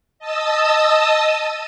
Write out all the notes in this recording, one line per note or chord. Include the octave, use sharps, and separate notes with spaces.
D#5 A5 D#6 E6